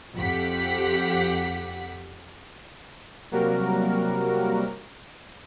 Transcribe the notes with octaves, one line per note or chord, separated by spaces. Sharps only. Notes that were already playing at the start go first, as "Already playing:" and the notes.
F2 G4 F#5 B6
C3 F#3 G3 A#3 F#4 A#4